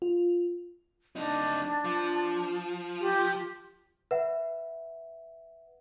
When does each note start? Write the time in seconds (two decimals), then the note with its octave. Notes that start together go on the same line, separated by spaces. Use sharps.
0.02 F4
1.16 F2 D4 D#4
1.85 F3
3.00 G4
4.11 B4 E5 F#5